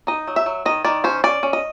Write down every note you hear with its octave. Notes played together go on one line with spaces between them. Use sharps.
D#4 D#5
F#3
E5
F#3
D#3 D#5
D#3 D5
C#4 C5
C#4 D5
C#4
D#5